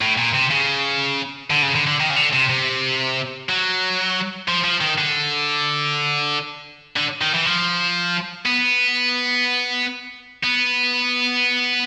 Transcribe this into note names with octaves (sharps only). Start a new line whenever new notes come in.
A2
A#2
C3
C#3
D3
C#3
D3
D3
D#3
C#3
D3
C3
C3
F#3
F3
F3
D#3
D3
D3
D#3
E3
F3
B3
B3